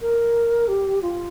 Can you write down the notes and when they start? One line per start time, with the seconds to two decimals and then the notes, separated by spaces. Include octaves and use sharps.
0.02 A#4
0.68 G4
1.02 F4